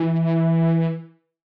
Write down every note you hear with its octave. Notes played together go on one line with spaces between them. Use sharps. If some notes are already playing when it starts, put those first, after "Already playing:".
Already playing: E3